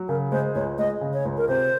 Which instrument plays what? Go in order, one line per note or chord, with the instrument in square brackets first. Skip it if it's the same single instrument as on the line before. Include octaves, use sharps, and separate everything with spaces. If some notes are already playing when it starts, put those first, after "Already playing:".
Already playing: [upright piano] F#3
[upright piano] C#3 [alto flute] A#4
[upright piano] G#3 [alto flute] C5
[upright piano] C#2 [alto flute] C#5
[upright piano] G#3 [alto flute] D#5
[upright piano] C#3
[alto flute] C#5
[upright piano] C#2
[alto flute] A#4
[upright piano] C3 [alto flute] C5